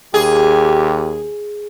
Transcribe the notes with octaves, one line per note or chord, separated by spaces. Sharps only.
D#2 G4 G#4